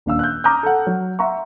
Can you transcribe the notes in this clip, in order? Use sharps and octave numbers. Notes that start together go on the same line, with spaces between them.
D#1 D4 F5 E6
F#6 G6
A#5 D6 D#6 F6 G6
A4 F#5
F#3
E5 F#5 A#5 C6 C#6